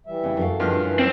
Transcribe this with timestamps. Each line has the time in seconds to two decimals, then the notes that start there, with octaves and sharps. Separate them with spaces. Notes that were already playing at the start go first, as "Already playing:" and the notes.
0.07 E3 G3 E5
0.23 C#3 D4 E4
0.37 F#2 A4 F5
0.60 G2 C#3 F3 D#5 F6
0.81 E3 C#4
0.99 C4